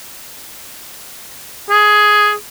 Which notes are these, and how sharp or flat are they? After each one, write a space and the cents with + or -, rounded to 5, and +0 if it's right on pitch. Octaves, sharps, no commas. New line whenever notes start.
G#4 +10